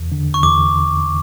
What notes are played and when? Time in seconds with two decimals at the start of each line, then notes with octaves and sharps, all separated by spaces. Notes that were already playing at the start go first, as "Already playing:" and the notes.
Already playing: E2
0.12 D3
0.34 C#6
0.43 E2 D6